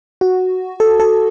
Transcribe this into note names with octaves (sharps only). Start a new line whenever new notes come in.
F#4
A4
A4